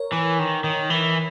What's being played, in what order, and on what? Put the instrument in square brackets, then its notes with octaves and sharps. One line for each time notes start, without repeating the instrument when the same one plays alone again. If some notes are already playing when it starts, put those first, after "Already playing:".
Already playing: [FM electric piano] A#4 C#5
[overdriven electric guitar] E3
D#3
D#3
E3